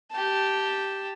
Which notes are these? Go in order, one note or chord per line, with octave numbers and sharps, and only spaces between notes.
G4 A5